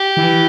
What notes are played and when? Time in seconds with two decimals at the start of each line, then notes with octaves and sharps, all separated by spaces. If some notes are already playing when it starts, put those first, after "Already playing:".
Already playing: G4
0.17 E3